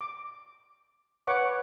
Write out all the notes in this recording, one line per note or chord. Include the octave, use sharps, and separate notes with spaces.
D6
B4 C#5 F#5 C#6 D6